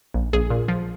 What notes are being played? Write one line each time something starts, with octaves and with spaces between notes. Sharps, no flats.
A#1
A#1 G#4
A#2
F3